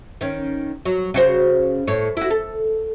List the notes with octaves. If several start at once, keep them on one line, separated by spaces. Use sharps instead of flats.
D#3 C#4
F#3
C#3 F#4 C5
A2 C#5
E4 F#4
A4